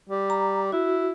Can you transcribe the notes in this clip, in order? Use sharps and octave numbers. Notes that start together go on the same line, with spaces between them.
G3
A#5
E4 F#4